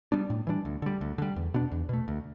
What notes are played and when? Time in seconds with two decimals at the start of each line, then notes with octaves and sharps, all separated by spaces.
0.12 G3 B3 D4
0.30 A2
0.47 E3 G3 D4
0.65 D2
0.82 D3 G3
1.01 D2
1.18 D3 G3
1.36 E2
1.54 B2 B3 D4
1.71 E2
1.89 B2 A3
2.08 D2